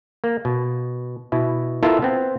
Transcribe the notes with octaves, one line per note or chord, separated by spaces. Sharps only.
A#3
B2
B2 E4
B3 E4 F4 A4 A#4 F5
B3 C4